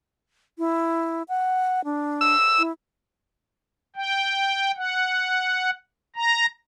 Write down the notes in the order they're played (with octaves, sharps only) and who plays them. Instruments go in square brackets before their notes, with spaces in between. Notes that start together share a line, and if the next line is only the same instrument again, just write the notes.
[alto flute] E4
F#5
D4
[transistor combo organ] E6
[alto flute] E4
[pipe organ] G5
F#5
A#5